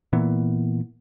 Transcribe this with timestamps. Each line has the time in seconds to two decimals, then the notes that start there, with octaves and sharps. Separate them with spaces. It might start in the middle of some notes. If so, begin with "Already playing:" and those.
0.13 A#2 E3 B3